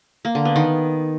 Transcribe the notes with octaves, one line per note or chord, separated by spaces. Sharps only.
A#3
D3
B3
D#3